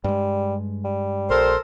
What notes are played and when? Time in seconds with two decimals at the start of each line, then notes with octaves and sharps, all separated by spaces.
0.04 G2 G3 G#3
0.84 G3
1.30 A#1 A4 A#4 C5